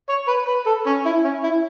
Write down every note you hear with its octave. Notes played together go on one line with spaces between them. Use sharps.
C#5
B4
B4
A4
C#4
E4
C#4
E4